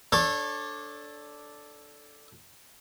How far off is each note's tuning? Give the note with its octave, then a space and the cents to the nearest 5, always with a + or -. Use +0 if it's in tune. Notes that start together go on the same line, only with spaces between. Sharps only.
D4 +0 A4 +0 C#5 -25